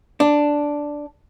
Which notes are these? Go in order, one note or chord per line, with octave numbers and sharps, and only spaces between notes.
D4